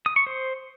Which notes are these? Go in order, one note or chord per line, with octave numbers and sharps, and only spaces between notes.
D#6
C#6
C5